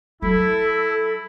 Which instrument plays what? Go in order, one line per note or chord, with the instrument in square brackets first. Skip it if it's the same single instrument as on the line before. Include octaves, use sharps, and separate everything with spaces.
[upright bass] F#3 [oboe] E4 [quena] A4